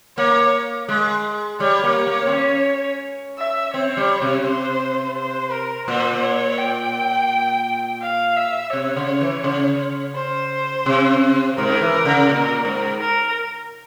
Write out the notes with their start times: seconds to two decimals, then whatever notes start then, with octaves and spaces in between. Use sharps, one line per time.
0.17 A#3 C#5
0.89 G#3
1.60 G3 C#5
1.84 A#3
1.96 C#5
2.07 A#3
2.27 C4
2.32 C#4
3.38 E5
3.74 C4 C#5
3.97 G3
4.22 C3
4.45 C5
5.17 C5
5.51 A#4
5.87 A#2 C5
6.23 C#5
6.58 G5
8.02 F5
8.37 E5
8.73 C3 C#5
8.96 C#3
9.20 E3
9.44 C#3
10.15 C5
10.86 C3
11.58 G#2 A#4
11.81 E3
12.05 C#3
12.29 A#2
12.65 G#2
13.00 A#4